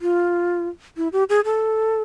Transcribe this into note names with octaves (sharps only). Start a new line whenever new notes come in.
F4
E4
G4
G#4
A4